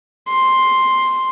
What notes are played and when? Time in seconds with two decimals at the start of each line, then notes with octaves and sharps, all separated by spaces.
0.28 C6